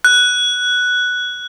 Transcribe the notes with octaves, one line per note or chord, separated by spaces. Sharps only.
F#6